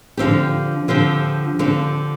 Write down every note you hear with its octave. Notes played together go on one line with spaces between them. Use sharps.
D3 F3 C4 G4
D3 F3 C4 G4
D3 F3 C4 G4